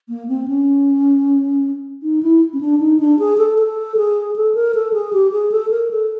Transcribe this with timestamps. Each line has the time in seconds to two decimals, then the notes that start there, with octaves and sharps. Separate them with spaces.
0.09 A#3
0.28 C4
0.48 C#4
2.03 D#4
2.23 E4
2.53 C#4
2.61 D4
2.80 D#4
3.00 D4
3.19 G#4
3.38 A4
3.58 A4
3.97 G#4
4.36 A4
4.55 A#4
4.75 A4
4.93 G#4
5.13 G4
5.32 G#4
5.52 A4
5.71 A#4
5.91 A4